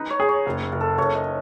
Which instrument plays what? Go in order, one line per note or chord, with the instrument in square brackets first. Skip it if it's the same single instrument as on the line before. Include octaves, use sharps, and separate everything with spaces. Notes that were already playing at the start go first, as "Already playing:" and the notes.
Already playing: [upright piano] D#4 [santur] B4
[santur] C#5
[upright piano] G#4
[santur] C#5
[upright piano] F#1
F#1
[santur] A4
[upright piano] F#1 [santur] C#5
[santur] D#5